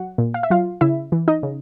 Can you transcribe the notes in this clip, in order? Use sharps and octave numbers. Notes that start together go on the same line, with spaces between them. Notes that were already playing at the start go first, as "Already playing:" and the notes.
Already playing: F#3 F#4 F#5
A#2
F5
E5
F#3 F4 F5
C#3 E4 E5
E3
D#4 D#5
C#3